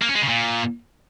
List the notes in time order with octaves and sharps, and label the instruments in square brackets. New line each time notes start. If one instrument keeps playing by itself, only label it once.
[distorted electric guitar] A#3
C#4
G#3
C#3
A#2